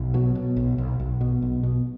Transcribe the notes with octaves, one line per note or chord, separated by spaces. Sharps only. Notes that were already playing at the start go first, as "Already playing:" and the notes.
Already playing: B1
B2 F#3
B2
B1
B1
B1
B2
B1
B2